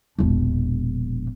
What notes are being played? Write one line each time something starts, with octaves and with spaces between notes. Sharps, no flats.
E1 A#1